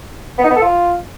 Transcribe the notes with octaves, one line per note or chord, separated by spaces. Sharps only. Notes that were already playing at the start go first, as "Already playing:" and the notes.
B3
D#4
B3
A4
F4